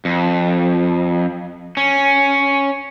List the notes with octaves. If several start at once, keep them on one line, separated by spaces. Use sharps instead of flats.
F2
C#4